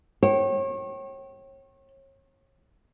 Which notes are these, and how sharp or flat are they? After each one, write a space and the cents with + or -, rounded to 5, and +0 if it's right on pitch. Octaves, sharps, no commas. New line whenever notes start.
C#5 -35 G5 -30